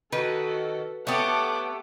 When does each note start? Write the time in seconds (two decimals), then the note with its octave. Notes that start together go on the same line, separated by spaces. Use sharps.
0.12 D#3 F#4 A4 B4
1.07 A3 B3 G4 A4 C#5 F#5 D6